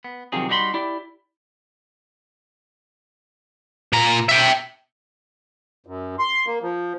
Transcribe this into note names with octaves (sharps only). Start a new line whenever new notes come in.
B3
C3 D#3 F3 F#3 C4 G#4
G3 D#4 F#4 C5 B5 C6
E4 G4 D5
A#2 A#5
E5 G5
F#2
C6
A#3
F3